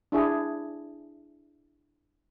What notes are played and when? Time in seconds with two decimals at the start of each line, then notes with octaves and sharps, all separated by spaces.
0.12 D4 E4 G#4